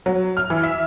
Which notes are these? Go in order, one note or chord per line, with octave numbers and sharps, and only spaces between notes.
F#3
F6
E3
E5